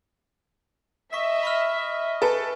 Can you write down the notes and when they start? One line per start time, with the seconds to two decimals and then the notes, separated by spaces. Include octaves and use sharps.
1.13 D#5 E5 C#6 B6
1.43 B5 C#6 F6
1.77 D#5
2.22 A4 B4 G#5